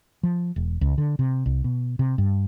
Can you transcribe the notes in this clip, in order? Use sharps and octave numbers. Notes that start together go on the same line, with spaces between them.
F3
E1
C#2
D3
C3
C2
B2
C3
G2